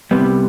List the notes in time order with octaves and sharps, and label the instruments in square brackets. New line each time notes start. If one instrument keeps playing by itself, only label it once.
[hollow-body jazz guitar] C2 C3 G3 B3